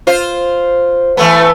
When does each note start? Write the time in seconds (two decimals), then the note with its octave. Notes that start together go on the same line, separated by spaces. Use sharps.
0.07 F4 C5
1.17 E3 A3 B3